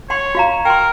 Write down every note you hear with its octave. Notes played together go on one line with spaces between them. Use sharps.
C#5 F#5 C6
F#4 F5 A#5
A#4 G5 C6